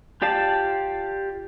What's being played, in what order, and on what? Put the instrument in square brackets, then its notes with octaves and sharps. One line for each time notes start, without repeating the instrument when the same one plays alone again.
[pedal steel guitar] F4 G4 D5 F5 A5